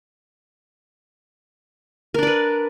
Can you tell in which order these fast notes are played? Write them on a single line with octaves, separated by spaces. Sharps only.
A#4 D4 D5 B4